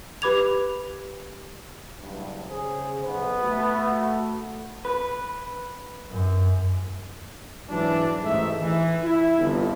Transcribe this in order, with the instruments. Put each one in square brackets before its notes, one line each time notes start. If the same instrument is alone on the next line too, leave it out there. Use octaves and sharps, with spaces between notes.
[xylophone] G4 B4 B5 D6 G#6 F7
[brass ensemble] F#1 G2
[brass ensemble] C#3 C5 [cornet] G#4
[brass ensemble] B1 [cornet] B3
[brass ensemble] A3 F#4
[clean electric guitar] B4
[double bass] F#2
[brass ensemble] G#2 E3 F#3 D4
A1 G#2 A3 D#4 E5
E3
E4
G1 F2